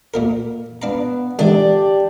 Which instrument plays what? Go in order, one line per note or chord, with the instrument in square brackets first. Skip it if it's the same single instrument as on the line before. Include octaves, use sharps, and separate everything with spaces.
[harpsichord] A#2 A#3 A#4
[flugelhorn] B3 [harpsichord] D4 F5 A#5
[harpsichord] G#2 D3 E3 [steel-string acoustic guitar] D4 [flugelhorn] G4